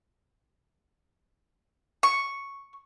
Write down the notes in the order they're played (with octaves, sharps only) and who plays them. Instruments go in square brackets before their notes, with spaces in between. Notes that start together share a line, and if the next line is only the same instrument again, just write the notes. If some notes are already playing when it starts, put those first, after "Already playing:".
[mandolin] C#6